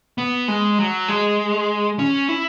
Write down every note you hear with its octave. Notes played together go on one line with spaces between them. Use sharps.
B3
G#3
F#3
G#3
C#4
E4